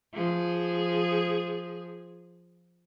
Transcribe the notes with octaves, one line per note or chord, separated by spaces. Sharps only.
F3 G#4